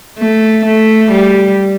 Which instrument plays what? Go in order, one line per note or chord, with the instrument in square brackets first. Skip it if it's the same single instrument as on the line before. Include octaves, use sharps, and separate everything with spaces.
[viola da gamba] A3
A3
G3